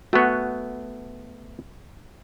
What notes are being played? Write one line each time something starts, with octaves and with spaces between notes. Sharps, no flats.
A3 B3 F#4